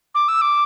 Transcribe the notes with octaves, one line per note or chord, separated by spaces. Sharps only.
D6
E6
D6